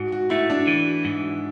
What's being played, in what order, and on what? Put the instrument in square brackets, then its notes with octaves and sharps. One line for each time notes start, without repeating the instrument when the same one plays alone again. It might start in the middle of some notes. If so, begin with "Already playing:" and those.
Already playing: [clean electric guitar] G#2 [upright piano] F#4
[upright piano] F#4
[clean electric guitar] A3 [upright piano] E4
[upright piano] D4
[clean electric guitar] E3
G#2